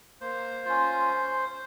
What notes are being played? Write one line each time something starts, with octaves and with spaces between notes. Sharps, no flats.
A#3 C5
C#4 F4